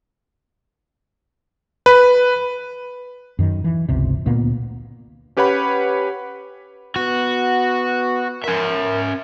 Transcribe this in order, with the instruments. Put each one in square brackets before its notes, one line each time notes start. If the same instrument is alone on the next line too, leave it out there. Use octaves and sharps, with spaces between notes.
[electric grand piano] B4
[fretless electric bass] F#2 D#3
E3
G1 C#2 C3
D2 A#2 A#3 B3
[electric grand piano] C#4 G4 B4 C#5 F#5 B5
[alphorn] B3 [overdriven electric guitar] F#4
[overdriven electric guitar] C#4 E5 [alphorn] A#4